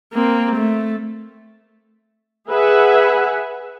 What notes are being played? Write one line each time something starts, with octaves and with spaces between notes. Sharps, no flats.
A#3 C4
A3
G#4 B4 E5 F#5 G#5